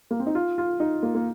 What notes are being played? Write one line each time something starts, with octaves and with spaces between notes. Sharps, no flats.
A#3
C4
D#4
F4
F4
D#4
A#3
A#3